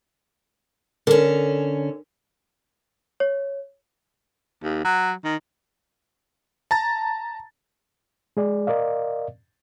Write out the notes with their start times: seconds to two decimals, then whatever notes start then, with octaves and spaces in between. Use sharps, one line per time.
1.07 D3 C#4 A4 A#4
3.20 C#5
4.63 D#2
4.85 F#3
5.24 D#3
6.71 A5 A#5 A6
8.37 G#3 G#4 D5
8.67 A#4 D5 D#5 F5